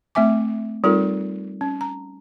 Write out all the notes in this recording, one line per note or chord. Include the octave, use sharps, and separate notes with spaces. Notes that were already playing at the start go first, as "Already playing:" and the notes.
A3 C4 E5 G#5 D6
G3 C4 D#4 F4 A4 A#4
C#4
A#5